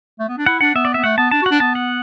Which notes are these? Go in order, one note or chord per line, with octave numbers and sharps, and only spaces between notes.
A3
B3
D4
E4 F#5
D4 F#5
B3 E5
D5
B3 E5
A3 F#5
B3 A5
D4 A5
F#4
D4 F#5
B3 A5
F#5